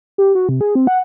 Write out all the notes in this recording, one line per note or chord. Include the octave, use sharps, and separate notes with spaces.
G4
F#4
C3
G#4
C4
F#5